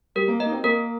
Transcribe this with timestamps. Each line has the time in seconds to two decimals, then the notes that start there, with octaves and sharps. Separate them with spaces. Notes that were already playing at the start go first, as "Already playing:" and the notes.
0.15 G3 A#4
0.28 A#3
0.40 A#3 D#5
0.46 D#4
0.52 C4
0.63 A#3 A#4